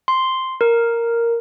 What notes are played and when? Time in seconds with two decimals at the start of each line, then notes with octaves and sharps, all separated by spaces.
0.08 C6
0.61 A#4